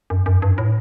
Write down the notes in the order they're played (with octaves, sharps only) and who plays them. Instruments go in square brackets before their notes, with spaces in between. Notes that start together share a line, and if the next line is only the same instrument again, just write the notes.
[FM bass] F#2
F#2
G2
A2